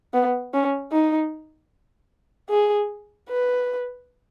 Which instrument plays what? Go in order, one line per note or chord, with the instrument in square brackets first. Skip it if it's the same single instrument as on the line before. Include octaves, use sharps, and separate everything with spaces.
[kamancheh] B3
C#4
D#4
G#4
B4